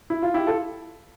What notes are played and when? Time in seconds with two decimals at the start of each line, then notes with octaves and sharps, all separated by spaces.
0.10 E4
0.22 F4
0.34 E4 G4
0.46 F4 A4